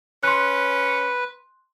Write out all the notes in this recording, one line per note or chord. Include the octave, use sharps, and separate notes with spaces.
C#4 B4 C6 F#6